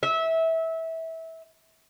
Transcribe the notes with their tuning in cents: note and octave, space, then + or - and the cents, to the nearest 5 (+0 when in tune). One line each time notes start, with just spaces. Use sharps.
E5 -20